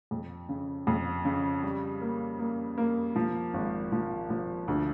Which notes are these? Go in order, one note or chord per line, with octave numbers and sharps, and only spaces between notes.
F2
C#3
F2
C#3
G3
A#3
A#3
A#3
F3
G#1
F3
F3
D2